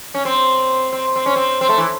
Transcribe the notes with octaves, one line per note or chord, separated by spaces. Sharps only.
C#4
C4
C4
C4
C#4
C4
C4
A3
E3